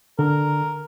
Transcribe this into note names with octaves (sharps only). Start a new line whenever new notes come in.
D3 A#4